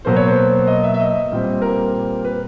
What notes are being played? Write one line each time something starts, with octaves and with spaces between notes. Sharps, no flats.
B2 F#3 A#3 C5
C#5
C5
D#5
E5
E5
D#5
A#2 G3 C4
A#4
B4